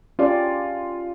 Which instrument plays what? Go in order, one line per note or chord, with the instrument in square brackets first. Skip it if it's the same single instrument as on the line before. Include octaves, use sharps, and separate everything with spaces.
[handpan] C#4 G4 D5 [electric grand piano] F4